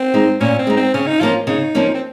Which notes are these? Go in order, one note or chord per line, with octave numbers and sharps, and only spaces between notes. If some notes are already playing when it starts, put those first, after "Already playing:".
Already playing: C4
G#3 D#4
A#2 C#4
C4
G#3 D#4
C4
C#3 C#4
D#4
F3 A#3 C#4 F4
C#3 D#4
F3 A#3 C#4
C4